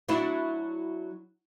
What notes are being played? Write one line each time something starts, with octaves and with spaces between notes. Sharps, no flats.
F#3 D4 E4